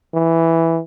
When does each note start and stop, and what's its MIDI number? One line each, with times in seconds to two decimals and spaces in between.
0.15 0.81 52